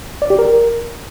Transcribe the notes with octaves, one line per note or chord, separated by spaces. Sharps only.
D5
G4
A#4